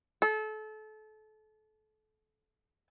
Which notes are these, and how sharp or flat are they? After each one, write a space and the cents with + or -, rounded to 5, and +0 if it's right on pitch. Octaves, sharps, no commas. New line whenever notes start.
A4 -30